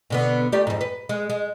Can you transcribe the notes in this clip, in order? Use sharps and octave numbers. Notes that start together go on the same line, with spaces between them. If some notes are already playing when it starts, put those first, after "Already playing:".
B2 D3 B3
A3 G4 D5
F2 G#2
B4
G#3
G#3